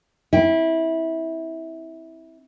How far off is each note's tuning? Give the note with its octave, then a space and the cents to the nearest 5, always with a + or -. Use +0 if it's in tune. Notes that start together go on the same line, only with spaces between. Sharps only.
C4 +10 E4 -20 G5 +0